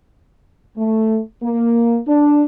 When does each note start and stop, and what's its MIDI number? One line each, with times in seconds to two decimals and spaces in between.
0.77 1.19 57
1.43 1.99 58
2.07 2.44 62